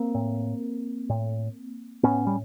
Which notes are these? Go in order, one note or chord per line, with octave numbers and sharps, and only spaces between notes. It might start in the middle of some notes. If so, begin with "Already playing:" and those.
Already playing: A#3 C4
A2
A2
A2 B3 C#4
G3